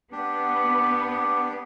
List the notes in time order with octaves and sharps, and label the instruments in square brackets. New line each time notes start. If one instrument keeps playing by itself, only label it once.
[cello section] B3 [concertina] D4 G4